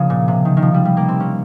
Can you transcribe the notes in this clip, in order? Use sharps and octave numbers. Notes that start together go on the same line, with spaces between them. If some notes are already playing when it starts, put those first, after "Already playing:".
Already playing: C#3 F3 A#3
A#2
C3
D#3
D#3
F3
G3
G3
A#3
C4
C#4